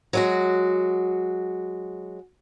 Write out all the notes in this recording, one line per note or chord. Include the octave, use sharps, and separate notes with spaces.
F#3 G#3 F#4